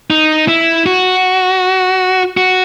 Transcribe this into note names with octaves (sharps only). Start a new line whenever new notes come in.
D#4
E4
F#4
F#4